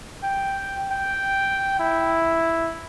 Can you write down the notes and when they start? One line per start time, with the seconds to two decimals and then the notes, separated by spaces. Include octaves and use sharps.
0.23 G5
0.91 G5
1.79 E4